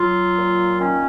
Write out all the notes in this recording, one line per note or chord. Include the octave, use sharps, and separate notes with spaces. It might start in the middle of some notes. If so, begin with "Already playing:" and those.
Already playing: F#3 F4
A#2
D#3 C#4